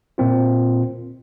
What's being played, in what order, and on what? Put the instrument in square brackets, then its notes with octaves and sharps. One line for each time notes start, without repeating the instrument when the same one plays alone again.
[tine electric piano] A#2 A#3 C4 F4